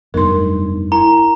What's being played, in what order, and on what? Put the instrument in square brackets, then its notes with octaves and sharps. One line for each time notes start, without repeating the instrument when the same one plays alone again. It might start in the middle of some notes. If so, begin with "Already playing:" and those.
[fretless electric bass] F1 G2 [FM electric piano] F#3 B3 D#4 [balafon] A#4 C6
[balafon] E4 [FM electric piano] A#4 G#5 C6 [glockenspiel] A#5